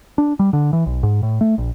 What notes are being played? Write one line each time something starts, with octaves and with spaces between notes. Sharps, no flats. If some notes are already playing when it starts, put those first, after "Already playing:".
D4
G3
D3
E3
B1
G#2
A2
A3
A#1